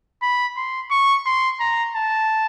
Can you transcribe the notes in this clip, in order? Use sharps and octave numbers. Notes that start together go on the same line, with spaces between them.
B5
C6
C#6
C6
A#5
A5